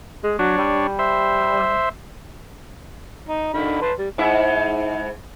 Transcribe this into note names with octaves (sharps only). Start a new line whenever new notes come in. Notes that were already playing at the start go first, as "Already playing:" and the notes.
G#3
F#3 D4 C#5
G3
C5 E5
D#4
D3 D#3 B5
B4 A5 C6
G3
G#2 E4 E5